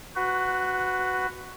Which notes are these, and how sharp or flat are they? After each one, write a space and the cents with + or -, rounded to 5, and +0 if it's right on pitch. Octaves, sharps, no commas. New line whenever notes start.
F#4 +0 B4 +15